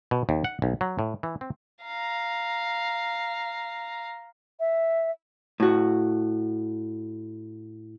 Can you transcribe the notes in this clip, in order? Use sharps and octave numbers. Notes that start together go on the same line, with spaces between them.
B2
D#2
F#5
B1
F#3
A2
E3
C4
F5 A#5
E5
A2 F#4